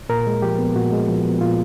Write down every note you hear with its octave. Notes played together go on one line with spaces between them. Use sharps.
A#2 A#4
G#3
F3 G4
B3
A#2 F#4
G#3
F3
B3
A#2 F4